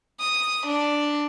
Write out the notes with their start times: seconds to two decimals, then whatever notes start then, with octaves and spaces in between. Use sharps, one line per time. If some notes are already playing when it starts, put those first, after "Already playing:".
0.20 D#6
0.67 D4